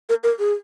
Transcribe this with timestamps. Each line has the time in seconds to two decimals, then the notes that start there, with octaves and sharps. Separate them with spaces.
0.09 A#4
0.24 A#4
0.39 G#4